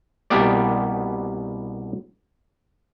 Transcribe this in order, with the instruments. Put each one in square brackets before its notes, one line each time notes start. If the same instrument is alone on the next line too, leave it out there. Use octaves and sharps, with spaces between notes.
[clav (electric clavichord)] C2 B2 A#3 B3 G4 D5